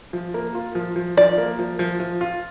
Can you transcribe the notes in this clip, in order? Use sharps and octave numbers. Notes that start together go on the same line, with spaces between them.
F3
A#3
F4
F3
F3
F3 D5
A#3
F3
F3
F3
F4